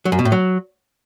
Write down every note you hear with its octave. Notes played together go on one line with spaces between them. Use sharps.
F#3
F#2
B2
A2
F#3